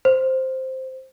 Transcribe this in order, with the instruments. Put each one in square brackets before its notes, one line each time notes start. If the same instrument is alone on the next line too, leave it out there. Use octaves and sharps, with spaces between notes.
[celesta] C5